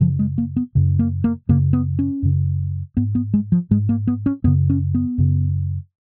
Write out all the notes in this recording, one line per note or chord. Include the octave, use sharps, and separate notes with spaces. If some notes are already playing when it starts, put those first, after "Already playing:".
F#2 C#3 F3
G#3
A#3
B3
F#2 C#3
A#3
A#3
F#2 C#3 A#3
B3
C#4
F#2 C#3
G#2 B3
B3
G#3
F3
G#2 G#3
A#3
B3
C#4
F#2 C#3 B3
C#4
B3
F#2 C#3